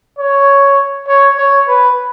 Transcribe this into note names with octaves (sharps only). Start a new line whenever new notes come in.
C#5
C#5
C#5
B4